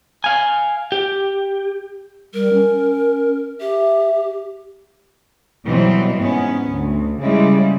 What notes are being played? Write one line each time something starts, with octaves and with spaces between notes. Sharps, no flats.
F5 G#5
G4
G3 A#4
C#4
G4 E5
B2 E3 F#3 G3 C4
G#2 B3 C#4
D2
C#3 G3 G#3 E4